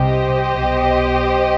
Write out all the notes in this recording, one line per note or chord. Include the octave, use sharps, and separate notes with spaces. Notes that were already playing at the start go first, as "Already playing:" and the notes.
Already playing: C2 C3 G4 C5 D#5
B1 B2